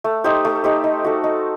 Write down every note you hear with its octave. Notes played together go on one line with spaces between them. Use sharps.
A3
D#4 G4 C5
A3
D#4 G4 C5
D#4
F#4 A4
D#4